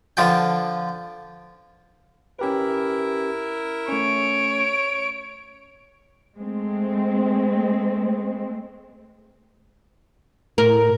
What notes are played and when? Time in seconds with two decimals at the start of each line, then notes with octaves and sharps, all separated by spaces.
0.17 D3 F3 B4 G5
2.39 C#4 E4 G4 A#4 B4
3.89 A3 C#4 C#5 D7
6.38 G#3 A3 C4
10.58 A2 A#4